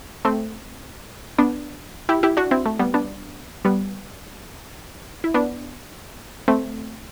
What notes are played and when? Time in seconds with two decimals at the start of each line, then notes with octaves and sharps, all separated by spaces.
0.25 A3 C4
1.38 B3 D4
2.09 E4 G4
2.23 E4 G4
2.37 D4 F#4
2.51 C4 E4
2.66 A3
2.79 G3 B3
2.94 B3 D4
3.65 G3 B3
5.24 E4
5.34 B3 D4
6.48 A3 C4